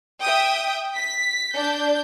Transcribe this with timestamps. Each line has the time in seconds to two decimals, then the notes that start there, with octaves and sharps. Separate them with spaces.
0.22 E5 G5 D#6
0.96 B6
1.57 D4 G6